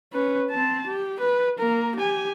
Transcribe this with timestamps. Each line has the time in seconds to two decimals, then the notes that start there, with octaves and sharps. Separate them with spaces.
0.13 C#4 B4
0.50 C4 A5
0.87 G4
1.20 B4
1.59 A#3 A#4
1.96 G4 G#5